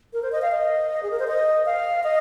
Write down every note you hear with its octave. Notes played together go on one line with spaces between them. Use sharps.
A#4
C5
D#5
F5
D#5
G#4
A#4
C5
D#5
F5
D#5